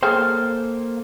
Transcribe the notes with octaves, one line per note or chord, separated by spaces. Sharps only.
A#3 G#4 A4 C5 C#5 F5 G5